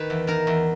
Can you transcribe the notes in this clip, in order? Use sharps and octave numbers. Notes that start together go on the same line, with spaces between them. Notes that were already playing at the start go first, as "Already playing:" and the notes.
Already playing: D#3 B4
E2
D#3 A#4
E2